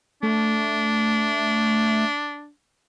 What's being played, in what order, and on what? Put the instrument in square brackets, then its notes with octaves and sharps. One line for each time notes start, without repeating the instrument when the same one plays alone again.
[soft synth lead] A3 [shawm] D4